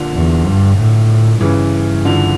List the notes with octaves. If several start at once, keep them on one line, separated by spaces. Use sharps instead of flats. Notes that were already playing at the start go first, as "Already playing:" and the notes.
Already playing: A#2 D3
E2
G2
A2
G2 C#3 E3
D3 F3